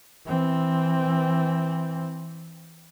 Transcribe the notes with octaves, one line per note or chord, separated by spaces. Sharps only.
E3 C4